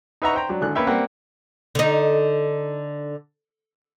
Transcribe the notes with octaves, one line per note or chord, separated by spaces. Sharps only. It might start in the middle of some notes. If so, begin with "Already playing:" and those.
D#4 B4 E5 F#5 A#5 C#6
C5 G5 A#5
F#3 D4
G#1 D3 F#6
A#3 C#4 B4 C#5 E5 G5
G3 A#3 C4 F#5
D3 D#4